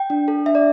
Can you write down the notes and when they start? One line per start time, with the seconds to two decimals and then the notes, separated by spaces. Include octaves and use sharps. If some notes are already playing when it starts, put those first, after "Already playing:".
Already playing: G5
0.10 D4
0.28 A4
0.46 D4 E5
0.55 D5